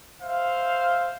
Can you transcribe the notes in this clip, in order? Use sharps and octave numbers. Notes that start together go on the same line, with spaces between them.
C5 E5 F5